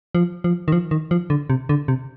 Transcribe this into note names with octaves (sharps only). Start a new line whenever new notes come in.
F3
F3
D#3
F3
D#3
F3
D3
C3
D3
C3